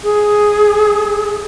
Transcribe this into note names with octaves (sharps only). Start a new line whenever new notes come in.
G#4